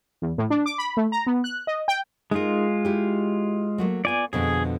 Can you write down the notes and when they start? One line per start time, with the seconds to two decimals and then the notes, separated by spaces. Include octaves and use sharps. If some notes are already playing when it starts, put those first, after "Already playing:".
0.22 E2
0.38 A2
0.50 D4
0.66 D6
0.78 B5
0.97 A3
1.12 A#5
1.27 B3
1.44 F#6
1.67 D#5
1.88 G5
2.31 G#3 D#4 F4 G#4 A#4
2.85 E4 G4
3.78 F#3 A3 A#3
4.05 B3 F4 D5 G#5
4.33 F2 B2 D3 G#4